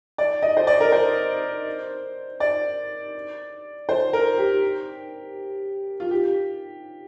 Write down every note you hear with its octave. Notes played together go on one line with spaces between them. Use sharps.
D5
D#5
C5
D5
A#4
C5
D5
C5
A#4
G4
F4
G4